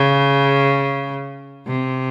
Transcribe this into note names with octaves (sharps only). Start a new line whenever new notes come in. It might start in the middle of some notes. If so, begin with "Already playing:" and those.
Already playing: C#3
C3